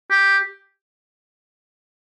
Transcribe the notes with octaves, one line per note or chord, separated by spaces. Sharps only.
G4